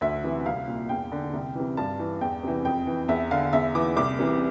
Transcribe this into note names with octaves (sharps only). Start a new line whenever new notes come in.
D2 E5
C3 E3
C2 F5
A#2
E2 G5
D3
C2
C3 E3
G2 A5
E3
E2 G5
C3 E3
F2 G5
E3
E2 E5
D3 F5
E2 E5
E3 D6
C2 D6
C3 E3